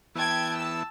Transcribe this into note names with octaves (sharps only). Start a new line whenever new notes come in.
E3 B3 E4 G5 A5 G#6
A5 E6